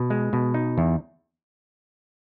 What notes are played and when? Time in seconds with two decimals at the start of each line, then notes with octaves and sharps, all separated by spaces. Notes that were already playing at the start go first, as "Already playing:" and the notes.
Already playing: B2
0.10 G#3
0.33 B2
0.54 D#4
0.78 E2